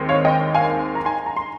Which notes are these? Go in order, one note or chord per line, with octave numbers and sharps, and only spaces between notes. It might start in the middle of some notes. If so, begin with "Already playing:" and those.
Already playing: D#2 D#3 G#3 C4
C#5 F5
D#5 G5
F5 G#5
A#5
G#5 C6
A#5
C6